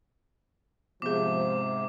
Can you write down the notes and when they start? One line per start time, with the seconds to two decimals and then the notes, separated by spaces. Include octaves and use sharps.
1.02 G#2 C3 F3 B3 G#4 D6